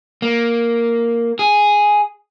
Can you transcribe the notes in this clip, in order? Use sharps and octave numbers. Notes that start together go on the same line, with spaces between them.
A#3
G#4